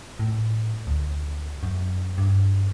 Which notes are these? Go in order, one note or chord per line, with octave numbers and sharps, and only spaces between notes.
A2
D2
F#2
G2